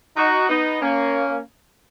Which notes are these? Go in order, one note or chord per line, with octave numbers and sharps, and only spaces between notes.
D#4 F#4
B3 D#4
A#3 C#4